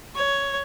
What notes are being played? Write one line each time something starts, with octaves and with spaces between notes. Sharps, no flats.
C#5